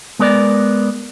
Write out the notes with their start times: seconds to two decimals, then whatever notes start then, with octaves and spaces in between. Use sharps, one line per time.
0.19 G#3 B3 A#4 D5